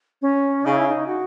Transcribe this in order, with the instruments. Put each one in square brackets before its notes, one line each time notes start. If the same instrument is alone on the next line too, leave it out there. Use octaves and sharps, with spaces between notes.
[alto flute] C#4
[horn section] C#3 [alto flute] D#4
[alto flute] E4
D#4
F#4